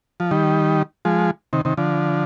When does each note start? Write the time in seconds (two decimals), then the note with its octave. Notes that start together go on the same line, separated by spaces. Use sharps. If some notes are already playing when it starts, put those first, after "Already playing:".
0.20 F3
0.31 D#3 G3
1.05 F3 G#3
1.53 C3 D#3
1.65 C3 D#3
1.77 D3 F3